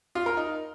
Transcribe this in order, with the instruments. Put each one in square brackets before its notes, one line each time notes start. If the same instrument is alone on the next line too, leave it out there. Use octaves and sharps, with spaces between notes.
[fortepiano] F4
A#4
D#4